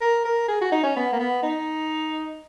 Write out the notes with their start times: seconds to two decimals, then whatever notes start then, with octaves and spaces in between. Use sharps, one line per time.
0.01 A#4
0.25 A#4
0.49 G#4
0.61 F#4
0.72 D#4
0.83 C#4
0.96 B3
1.12 A#3
1.20 B3
1.43 D#4